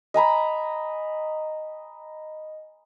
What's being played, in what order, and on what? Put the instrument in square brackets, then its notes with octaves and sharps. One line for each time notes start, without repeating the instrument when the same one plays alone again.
[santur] D#5 G#5 A#5 B5